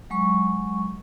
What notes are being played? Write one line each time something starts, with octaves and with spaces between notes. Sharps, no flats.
F#3 G#3 C#6